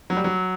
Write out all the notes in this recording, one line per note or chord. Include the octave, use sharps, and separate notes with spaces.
F#3
G3
F#3